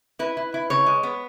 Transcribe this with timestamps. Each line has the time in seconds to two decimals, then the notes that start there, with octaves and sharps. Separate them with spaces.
0.19 E4 B4
0.37 E4
0.54 E4
0.70 C#3 C#5
0.86 G#3
1.03 B3